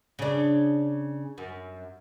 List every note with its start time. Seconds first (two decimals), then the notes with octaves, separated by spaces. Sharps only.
0.19 C#3 D4
1.38 F#2